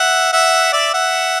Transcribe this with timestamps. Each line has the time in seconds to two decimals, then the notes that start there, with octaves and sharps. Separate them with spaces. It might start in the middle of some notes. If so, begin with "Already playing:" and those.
Already playing: E5 F#5
0.33 E5 F#5
0.73 D5 E5
0.94 E5 F#5